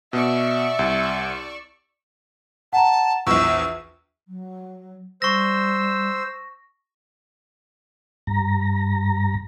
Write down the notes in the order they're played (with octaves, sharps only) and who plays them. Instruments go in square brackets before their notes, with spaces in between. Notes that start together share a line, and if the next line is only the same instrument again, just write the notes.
[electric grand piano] B2 [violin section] D5 C#6 E6 [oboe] E5
[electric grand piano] C2
[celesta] F#5 A#5 [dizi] A5
[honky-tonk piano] A#1 E2 [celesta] C#6 [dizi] E6
[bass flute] F#3
[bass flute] G3 [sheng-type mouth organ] C5 E6 [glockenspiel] C#6 A#6
[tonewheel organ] G2 A#5